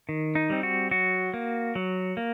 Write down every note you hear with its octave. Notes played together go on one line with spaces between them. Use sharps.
D#3
D#4
G3 C4
F#4
F#3 F#4
A#3
F#3
A#3